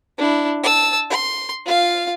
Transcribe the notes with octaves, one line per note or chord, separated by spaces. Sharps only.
D4 E4
A5 E6
C6
F4 F5